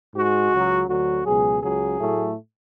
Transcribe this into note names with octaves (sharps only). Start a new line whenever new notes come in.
G#2 G#3 F#4
C#2 C#3 F#3
D2 D3 F#3 F#4
C#2 B2 F#3 G#4
C#2 C#3 F#3 G#4
A2 F#3 A3